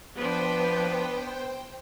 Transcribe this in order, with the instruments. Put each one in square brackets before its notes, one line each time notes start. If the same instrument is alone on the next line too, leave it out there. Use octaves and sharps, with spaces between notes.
[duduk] F3 [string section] B3 [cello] D4 B4 [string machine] C5 G5